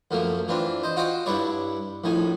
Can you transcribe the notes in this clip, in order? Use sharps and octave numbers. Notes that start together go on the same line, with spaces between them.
F#2 F3 A3 A#3
E3 C4 D4 F4
C5 D#5
F4 F#4 C5 D#5 F#5 G5
G2 D4 E4 C#5 D5
A#1 A2 D#4 G#5